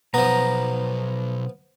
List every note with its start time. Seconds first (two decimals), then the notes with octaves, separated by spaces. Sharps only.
0.14 B1 F3 B3 A#5